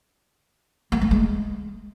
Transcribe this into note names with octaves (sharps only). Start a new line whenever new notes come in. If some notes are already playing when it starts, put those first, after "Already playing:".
A#3
A3
G#3